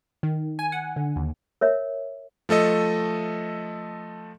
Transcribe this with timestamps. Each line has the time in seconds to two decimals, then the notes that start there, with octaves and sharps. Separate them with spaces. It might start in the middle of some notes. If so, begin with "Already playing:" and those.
0.23 D#3
0.59 G#5
0.72 F#5
0.96 D3
1.16 D#2
1.61 A#4 C#5 E5
2.49 F3 A3 A4 D#5